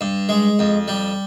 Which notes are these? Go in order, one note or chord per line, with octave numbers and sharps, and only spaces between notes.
G2
G#3
F2
G3